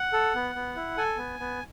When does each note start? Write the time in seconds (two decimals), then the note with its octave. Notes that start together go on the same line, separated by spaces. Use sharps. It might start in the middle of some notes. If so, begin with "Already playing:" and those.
Already playing: F#5
0.13 A4
0.35 B3
0.55 B3
0.76 E4
0.97 A4 G#5
1.17 B3
1.40 B3